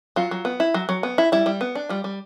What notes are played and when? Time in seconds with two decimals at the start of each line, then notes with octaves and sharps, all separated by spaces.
0.16 F#3 F4
0.31 F#3
0.45 B3
0.60 E4
0.74 F#3
0.89 F#3
1.03 B3
1.18 E4
1.32 G3 E4
1.46 G3
1.61 B3
1.75 D4
1.89 G3 F4
2.04 G3